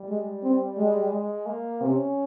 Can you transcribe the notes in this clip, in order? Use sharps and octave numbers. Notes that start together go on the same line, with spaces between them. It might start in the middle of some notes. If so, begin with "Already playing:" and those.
Already playing: G3
G#3
C4
G#3
G#3
A#3
C3 C#4